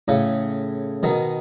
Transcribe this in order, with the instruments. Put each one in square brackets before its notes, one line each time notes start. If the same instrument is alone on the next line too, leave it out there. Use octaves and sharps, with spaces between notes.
[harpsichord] A2 C#3
B2 D#3